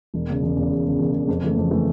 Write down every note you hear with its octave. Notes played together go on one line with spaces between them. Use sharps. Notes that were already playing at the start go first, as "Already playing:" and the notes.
E1
E2 C#3
E1
E2 C#3
E1
E2 C#3
E1
E2 C#3
F2
C#3 E3 A3
F2
C#3 E3 A3